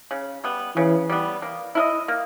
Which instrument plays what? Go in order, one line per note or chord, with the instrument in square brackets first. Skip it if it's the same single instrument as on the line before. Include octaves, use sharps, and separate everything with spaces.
[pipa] C#3
G3 B3
[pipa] C#3 [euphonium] E3
[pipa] G3 B3
A#3
E4 A#4 D#5
A#3